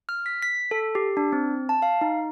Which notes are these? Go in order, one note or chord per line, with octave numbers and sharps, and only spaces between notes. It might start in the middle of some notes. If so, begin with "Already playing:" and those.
F6
B6
B6
A4
G4
D4
C4
A5
F5
D#4